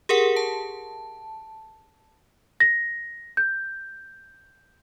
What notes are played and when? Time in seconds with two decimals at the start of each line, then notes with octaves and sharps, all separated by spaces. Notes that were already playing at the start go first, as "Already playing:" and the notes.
0.09 G4 G#4 A#4 F#5
0.36 A5
2.60 A#6
3.37 G6